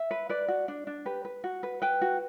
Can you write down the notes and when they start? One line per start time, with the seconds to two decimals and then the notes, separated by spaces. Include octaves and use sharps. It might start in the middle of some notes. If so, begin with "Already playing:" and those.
Already playing: E5
0.11 B4
0.29 B4 D5
0.48 F#4
0.68 D4
0.87 D4
1.05 G4 B4
1.25 B4
1.44 F#4
1.63 B4
1.82 B4 G5
2.01 F#4